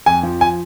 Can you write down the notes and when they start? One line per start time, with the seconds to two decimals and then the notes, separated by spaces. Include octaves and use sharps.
0.06 F2 G#5
0.23 F3
0.41 G#5